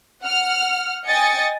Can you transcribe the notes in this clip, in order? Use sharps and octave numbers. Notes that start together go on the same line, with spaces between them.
F#5 F6
D#5 G5 G#5 D#6 A6 C#7